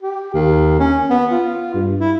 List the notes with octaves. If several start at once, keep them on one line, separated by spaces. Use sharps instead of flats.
G4
D#2
C#4
B3
F4
G2
E4